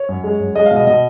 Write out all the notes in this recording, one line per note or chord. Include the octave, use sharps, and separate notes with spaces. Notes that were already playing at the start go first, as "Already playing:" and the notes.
Already playing: C#5
F#2
G#3
F#2
G#3 D#5
F5
B2 D#5
B2 D#5